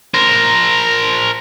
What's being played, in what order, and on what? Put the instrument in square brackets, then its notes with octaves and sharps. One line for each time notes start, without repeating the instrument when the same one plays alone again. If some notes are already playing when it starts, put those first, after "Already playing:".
[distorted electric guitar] A#4 C5